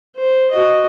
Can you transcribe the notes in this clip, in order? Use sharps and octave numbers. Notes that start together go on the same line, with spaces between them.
C5
F#4 D#5